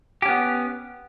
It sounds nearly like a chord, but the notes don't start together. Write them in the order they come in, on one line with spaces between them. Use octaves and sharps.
G4 C#4 B3